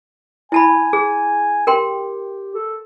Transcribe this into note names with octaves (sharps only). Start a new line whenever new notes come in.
E4 G#5 A5 B5
G#4
G4 A#4 G5 C6
A4